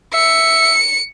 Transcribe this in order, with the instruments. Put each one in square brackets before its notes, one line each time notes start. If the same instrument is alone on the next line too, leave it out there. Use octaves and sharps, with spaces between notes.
[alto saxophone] E5 [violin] C#7